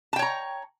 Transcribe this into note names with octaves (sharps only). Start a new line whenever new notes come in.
C#5 G5 A5 A#5